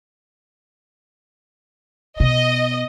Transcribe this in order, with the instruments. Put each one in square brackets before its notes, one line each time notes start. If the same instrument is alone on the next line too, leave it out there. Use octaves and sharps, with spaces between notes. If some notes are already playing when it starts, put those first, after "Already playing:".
[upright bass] B2 [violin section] D#5